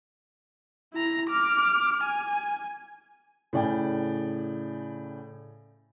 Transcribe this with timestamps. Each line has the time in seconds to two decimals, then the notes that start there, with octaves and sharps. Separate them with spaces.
0.93 E4 A#5
1.30 D6 F6
2.04 G#5
3.53 A2 C#3 D5 G5 G#5